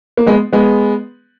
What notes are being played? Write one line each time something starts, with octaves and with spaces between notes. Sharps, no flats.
A#3
G#3 B3
G#3 B3